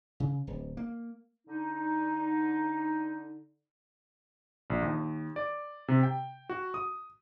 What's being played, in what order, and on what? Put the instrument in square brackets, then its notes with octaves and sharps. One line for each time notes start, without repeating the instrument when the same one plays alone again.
[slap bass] C#3
D1
A#3
[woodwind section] D3 D#4
[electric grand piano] A#1
D#2
D5
C3
G5
F#4
D#6